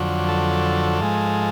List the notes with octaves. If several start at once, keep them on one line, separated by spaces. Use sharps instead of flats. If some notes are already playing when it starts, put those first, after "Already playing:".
Already playing: F2 D3 F#3
A4
G#2 F3 G#3